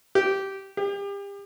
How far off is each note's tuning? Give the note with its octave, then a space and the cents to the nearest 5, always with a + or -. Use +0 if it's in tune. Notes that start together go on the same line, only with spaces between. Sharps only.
G4 -15
G4 +35